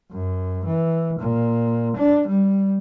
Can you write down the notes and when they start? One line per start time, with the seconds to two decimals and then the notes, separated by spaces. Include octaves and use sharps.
0.12 F#2
0.65 E3
1.19 A#2
1.97 D4
2.28 G3